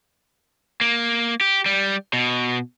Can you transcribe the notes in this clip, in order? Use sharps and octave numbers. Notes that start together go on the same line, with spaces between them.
A#3
G4
G3
B2